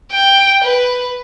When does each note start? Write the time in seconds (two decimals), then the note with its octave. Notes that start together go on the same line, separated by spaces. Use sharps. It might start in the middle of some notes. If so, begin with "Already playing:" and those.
0.12 G5
0.63 B4